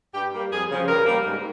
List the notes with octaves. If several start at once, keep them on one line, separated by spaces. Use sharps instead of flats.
G2 G4
G3 A#3
F2 G#4
C#3 F3
G2 A#4
G3 A#3
G#2